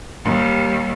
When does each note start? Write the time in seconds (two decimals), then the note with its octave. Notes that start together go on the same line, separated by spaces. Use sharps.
0.23 D#2 G3